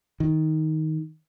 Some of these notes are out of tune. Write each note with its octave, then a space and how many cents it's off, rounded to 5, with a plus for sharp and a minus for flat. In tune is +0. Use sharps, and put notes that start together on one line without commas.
D#3 +10